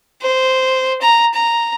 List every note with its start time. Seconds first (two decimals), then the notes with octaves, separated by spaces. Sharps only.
0.22 C5
1.02 A#5
1.34 A#5